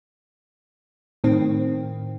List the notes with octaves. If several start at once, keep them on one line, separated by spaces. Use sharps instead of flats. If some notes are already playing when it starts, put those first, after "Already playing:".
A2 D#3 C4